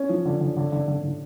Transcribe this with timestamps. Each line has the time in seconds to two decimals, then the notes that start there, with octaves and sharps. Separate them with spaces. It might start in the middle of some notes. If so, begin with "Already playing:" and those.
Already playing: C#4
0.09 F3
0.25 D3
0.41 D3
0.57 D3
0.72 D3
0.87 D3
1.03 D3